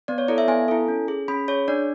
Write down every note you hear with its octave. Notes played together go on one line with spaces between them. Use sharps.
B3 D5
C#5
E4 A4 D5
E5
B3 G#5
E4 A4
C#4
G#4
C#4 B5
G#4 C#5
D4 D5